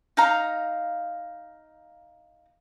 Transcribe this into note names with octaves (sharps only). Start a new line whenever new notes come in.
D#4 F5 A#5